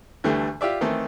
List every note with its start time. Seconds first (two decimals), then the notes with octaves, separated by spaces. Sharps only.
0.24 D2 D3 E3 G3 A3
0.61 F4 G4 D5 E5
0.81 D#3 E3 A3 C4 A4